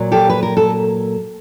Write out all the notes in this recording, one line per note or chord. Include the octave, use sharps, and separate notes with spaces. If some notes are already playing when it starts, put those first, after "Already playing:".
Already playing: A#2 F#3
G4 A4
B4
A#4
A4